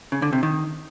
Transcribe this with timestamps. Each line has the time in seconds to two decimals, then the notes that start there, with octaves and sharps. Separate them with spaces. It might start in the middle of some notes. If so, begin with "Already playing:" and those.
0.12 C#3
0.22 D3
0.33 C3
0.43 D#3